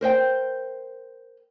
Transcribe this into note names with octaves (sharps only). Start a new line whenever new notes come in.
A#4 C5 D#5 G5